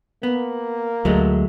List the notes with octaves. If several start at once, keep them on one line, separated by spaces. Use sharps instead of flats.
A#3 B3
D2 F#3 G#3 A3